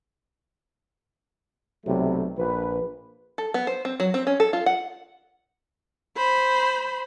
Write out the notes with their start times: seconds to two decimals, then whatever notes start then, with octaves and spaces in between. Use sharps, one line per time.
1.86 B1 C3 F#3 G3 A3
2.37 A#1 F3 B4
3.38 A4
3.54 B3
3.67 C5
3.85 C4
4.00 F#3
4.14 C4
4.27 C#4
4.40 A4
4.53 F4
4.66 F#5
6.17 C5 B5